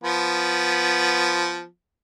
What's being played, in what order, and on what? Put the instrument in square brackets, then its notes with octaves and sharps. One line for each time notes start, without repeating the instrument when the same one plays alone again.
[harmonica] F3 B3